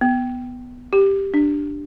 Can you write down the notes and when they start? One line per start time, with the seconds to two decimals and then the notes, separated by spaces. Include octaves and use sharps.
0.01 B3
0.93 G4
1.34 D4